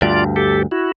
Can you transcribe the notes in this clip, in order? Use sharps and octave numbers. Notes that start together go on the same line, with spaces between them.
D2 G2 F4 D5
G4 A4
E4 F#4